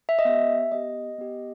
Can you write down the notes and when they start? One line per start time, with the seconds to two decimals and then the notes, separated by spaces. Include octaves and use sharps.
0.09 E5
0.19 D#5
0.25 B3 G4 E5
0.72 B3 G4 D#5
1.18 B3 G4